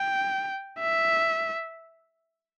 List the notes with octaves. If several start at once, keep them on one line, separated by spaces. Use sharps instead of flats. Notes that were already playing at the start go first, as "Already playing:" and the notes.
Already playing: G5
E5